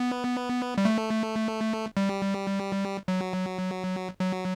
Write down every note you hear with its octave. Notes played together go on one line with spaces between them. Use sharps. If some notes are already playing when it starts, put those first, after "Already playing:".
Already playing: B3
G3
A3
G3
F#3
F#3